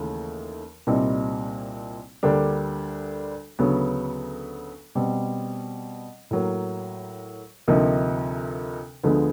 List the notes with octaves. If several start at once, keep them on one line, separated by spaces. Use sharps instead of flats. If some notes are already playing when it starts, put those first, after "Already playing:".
Already playing: D#2 C#3 E3 A3
C2 A#2 G3 C4 D#4
D2 D3 G3 A#3 D4
D2 C#3 F#3 B3
B2 G3 C4
A2 F#3 A#3
D2 C3 F3 A#3 D#4
D2 D3 F3 G#3 B3